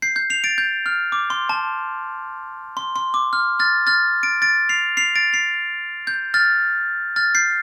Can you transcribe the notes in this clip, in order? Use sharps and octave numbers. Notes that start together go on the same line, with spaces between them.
G6 C7
G6
C7 F7
A6 D7
G6
F6
D6
C6
A5
C6
C6
D6
F6
F6 A6
F6 A6
A6 D7
A6 D7
C7 F7
C7 F7
A6 D7
C7 F7
G6
F6 A6
F6 A6
G6 C7